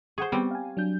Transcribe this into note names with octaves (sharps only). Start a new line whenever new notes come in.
G#4 C5 F#5 C#6
G3 B3 C4
F5 G#5
F#3 D4 G6